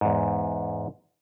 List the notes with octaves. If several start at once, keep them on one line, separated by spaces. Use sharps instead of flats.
E2 G#2